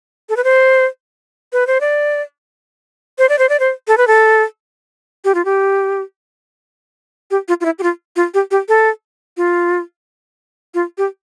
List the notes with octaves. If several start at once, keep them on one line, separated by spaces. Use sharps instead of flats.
A4
B4
C5
B4
C5
D5
C5
D5
C5
D5
C5
A4
B4
A4
G4
F4
G4
G4
F4
F4
E4
G4
F4
F4
G4
G4
A4
F4
F4
G4